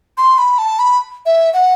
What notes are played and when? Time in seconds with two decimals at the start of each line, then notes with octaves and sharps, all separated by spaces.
0.18 C6
0.38 B5
0.58 A5
0.79 B5
1.26 E5
1.54 F#5